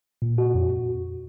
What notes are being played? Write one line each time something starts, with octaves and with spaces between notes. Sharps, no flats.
A#2
F#4
F2